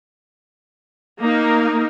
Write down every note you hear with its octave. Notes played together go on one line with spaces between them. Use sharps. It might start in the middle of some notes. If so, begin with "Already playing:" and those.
A#3 D#4 A#4